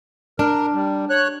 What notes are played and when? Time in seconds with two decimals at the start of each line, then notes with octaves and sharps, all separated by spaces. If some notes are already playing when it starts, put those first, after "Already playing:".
0.39 D4 A#4
0.74 G3
1.10 C#5 F#6